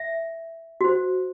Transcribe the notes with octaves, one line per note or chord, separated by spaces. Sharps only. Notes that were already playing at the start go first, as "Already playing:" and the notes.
Already playing: E5
F#4 C5